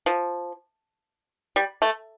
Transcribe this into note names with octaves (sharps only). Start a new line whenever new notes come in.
F3
G3
A3